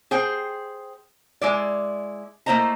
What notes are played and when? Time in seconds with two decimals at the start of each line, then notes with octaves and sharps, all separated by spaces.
0.11 G#4 C5 G5
1.41 G#3 E4 D5
2.46 A3 A#3 E4 C5 D#5 A#5